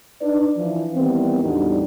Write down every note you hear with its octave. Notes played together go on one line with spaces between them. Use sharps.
D4 D#4 B4 D5
E3 F3
D#3 E3 G3 B3 C4
E2 A2 G3 D4 D#4 F#4